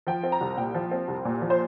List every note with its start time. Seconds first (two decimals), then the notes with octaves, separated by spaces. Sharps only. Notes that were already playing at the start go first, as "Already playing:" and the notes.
0.07 F3 G5
0.23 C4
0.32 A#5
0.41 C2
0.57 A#2 G5
0.75 F3
0.91 C4
1.08 C2
1.25 A#2
1.42 F3
1.50 C5